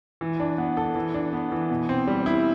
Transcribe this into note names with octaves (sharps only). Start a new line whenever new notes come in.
E3
D4
B3
A4
E3
D4
B3
E3
B2
C4
G3
E4